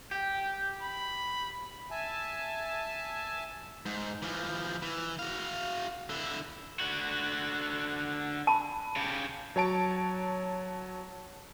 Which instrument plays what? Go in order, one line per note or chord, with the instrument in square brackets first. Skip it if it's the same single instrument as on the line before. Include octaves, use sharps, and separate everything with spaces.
[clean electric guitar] G4 [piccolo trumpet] G5
[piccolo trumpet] B5
[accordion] E5 G#5 A5
[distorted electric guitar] G#2
E3 F3
E3
F#4 F5
D3 E4
[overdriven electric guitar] D3 F#4
[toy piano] A5 B5
[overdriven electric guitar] C#3 G4
[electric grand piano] F#3 C#5 A5 D7